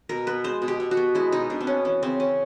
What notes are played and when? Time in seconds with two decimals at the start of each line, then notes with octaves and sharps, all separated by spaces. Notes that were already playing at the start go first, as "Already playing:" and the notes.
0.09 B2 A#4
0.27 B3 B4
0.44 G#3 C5
0.62 B2
0.68 G4
0.80 B2
0.91 F#4
0.97 B3
1.15 G#3 E4
1.32 B2 D#4
1.50 B2 D4
1.61 C4
1.67 B3 C#4
1.85 E3 C#4
2.02 C#3 C4
2.20 C#3 C#4